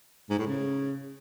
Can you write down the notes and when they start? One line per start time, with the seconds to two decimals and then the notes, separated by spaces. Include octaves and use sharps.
0.30 G#2
0.39 A2
0.47 C#3